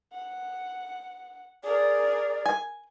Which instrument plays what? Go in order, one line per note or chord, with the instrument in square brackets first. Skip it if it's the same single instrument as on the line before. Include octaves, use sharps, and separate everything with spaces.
[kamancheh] F#5
[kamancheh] G#4 A#4 [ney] D5
[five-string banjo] G#5